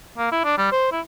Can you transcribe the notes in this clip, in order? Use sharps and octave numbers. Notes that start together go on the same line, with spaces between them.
A#3
E4
D4
G3
C5
E4